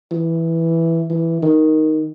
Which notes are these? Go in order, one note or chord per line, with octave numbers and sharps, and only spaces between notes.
E3
E3
D#3